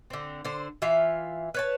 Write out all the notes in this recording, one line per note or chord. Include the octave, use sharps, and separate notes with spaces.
D3 C4
D3 C5
E3 F4 E5 F5
B4 C#5 A5